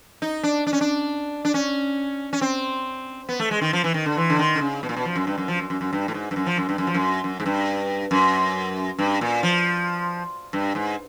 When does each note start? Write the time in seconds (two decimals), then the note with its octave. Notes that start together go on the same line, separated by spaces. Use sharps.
0.22 D#4
0.43 D4
0.67 D4
0.73 C#4
0.81 D4
1.45 D4
1.54 C#4
2.33 C#4
2.41 C4
3.29 B3
3.40 A3
3.51 G#3
3.61 D#3
3.73 F3
3.84 E3
3.94 D#3
4.06 D3
4.17 E3
4.30 D3
4.39 D#3
4.55 D3
4.61 C#3
4.83 B2
4.89 A#2
4.96 B2
5.05 F3
5.16 F#2
5.27 G2
5.38 F#2
5.48 F3
5.59 F#2
5.70 F#2
5.81 F#2
5.93 G2
6.08 A2
6.14 G#2
6.31 G2
6.36 F#2
6.46 F3
6.57 F#2
6.69 G2
6.78 F#2
6.87 F3
6.94 F#2
7.24 F#2
7.40 G#2
7.46 G2
8.11 F#2
8.99 G2
9.21 A#2
9.43 F3
10.53 G2
10.75 G#2